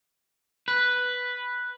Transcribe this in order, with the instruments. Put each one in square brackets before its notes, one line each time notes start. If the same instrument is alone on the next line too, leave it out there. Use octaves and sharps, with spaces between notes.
[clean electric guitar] B4